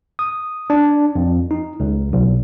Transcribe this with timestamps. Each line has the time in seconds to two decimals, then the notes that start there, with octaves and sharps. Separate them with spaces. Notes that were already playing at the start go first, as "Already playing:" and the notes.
0.19 D#6
0.70 D4
1.15 F2
1.51 D#4
1.80 C#2
2.13 B1